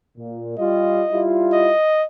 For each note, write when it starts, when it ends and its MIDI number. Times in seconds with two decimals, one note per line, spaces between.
0.18 0.57 46
0.58 1.02 55
0.58 1.02 65
0.58 1.23 75
1.13 1.70 55
1.13 1.70 64
1.13 1.70 65
1.53 2.05 75